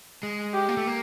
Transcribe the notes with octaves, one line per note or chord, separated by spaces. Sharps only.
G#3
G4
A#3
A3
A#3